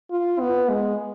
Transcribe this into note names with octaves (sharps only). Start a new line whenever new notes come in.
F4
B3
G#3